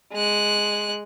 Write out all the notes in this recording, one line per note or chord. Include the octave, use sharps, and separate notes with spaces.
G#3 F#6